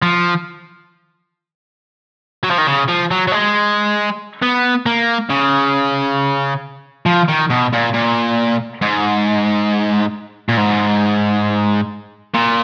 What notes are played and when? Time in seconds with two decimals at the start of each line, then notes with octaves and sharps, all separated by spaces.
0.02 F3
2.44 F#3
2.51 F3
2.58 D#3
2.67 C#3
2.88 F3
3.11 F#3
3.27 F#3
3.32 G#3
4.42 B3
4.86 A#3
5.30 C#3
7.06 F3
7.28 D#3
7.50 B2
7.73 A#2
7.94 A#2
8.82 G#2
10.49 A#2
10.57 G#2
12.34 A#2